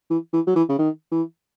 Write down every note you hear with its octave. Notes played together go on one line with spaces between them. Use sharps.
E3
E3
F#3
E3
C#3
D#3
E3